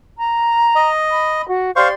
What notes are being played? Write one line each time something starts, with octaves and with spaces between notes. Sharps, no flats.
A#5
D#5
B5
F#4
G4 C5 D5 F5 C6 C#6